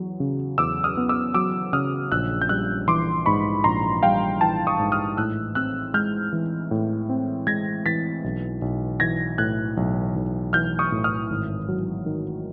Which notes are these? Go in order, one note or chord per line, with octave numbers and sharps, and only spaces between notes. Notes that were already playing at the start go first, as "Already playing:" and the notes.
Already playing: E2 F#3
C#3
E2 D6 E6
D#6 F6
B3
D6 E6
F#3 D6 E6
C#3 D#6 F6
A#1 E6 F#6
G6
G3 E6 F#6
E3 C6 D6
G#2 B5 C#6
A#1 A#5 C6
G3 F5 G5
E3 G5 A5
C#6 D#6
G#2
D#6 F6
A2 E6 F#6
C4 E6 F#6
G#3 F6 G6
E3
A2
C4
G#3 G#6 A#6
E3 A6 B6
B1
B1
E3 G#6 A#6
A2 F#6 G#6
B1
B1
E3 F6 G6
C#6 D#6
A2
D#6 F6
G#1
F#3
D#3